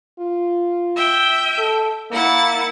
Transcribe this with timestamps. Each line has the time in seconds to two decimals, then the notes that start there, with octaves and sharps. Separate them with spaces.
0.19 F4
0.96 E5 G5 G6
1.58 A4
2.11 A#3 E4 F#5 A6